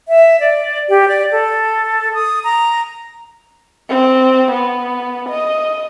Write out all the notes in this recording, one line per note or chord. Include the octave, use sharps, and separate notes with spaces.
E5
D5
G4
D5
A4
D#6
A#5
C4
B3
D#5